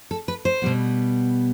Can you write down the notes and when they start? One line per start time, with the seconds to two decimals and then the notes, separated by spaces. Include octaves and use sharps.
0.11 A4
0.28 B4
0.45 C5
0.62 B2 G3 B3